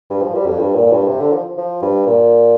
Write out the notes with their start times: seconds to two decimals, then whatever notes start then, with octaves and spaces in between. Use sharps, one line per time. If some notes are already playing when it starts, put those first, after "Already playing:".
0.10 G2
0.22 F3
0.35 G3
0.47 F2
0.59 G2
0.75 A#2
0.86 A#2
0.92 G2
1.08 C3
1.20 D3
1.32 F3
1.58 F3
1.82 G2
2.06 A#2